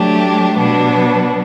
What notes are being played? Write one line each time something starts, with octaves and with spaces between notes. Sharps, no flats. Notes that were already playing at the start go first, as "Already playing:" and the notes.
Already playing: F#3 A3 D4 G4
B2 F#3 B3 D4